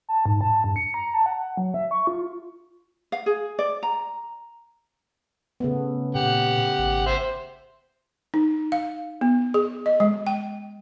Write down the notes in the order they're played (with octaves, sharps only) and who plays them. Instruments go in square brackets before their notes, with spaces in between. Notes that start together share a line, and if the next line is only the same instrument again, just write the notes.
[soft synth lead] A5
G#2
A5
G2
C#7
A#5
A5
F#5
F#3
E5
C#6
F4
[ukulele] F5
G#4
D5
A#5
[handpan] C#3 A3 B3
[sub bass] A#2 [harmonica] G4 F#5
[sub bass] G#1
[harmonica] C5 E5
[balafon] D#4
F5
B3
G#4
D#5
G#3
G5